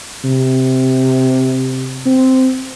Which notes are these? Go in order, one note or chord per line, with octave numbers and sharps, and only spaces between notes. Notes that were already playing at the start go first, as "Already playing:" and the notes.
C3
C4